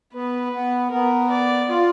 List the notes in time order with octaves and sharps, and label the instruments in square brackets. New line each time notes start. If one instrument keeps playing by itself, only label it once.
[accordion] B3 [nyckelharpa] B4
[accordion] B3
[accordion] B3 [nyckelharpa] A#4
[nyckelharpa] D5
[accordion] F4